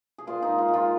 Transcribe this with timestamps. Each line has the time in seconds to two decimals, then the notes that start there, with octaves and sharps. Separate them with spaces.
0.18 G#4
0.27 A#2 F4
0.42 G#3 D#4
0.58 F4
0.68 G#3
0.74 F4